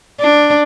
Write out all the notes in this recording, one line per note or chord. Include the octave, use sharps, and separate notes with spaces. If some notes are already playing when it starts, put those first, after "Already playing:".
D4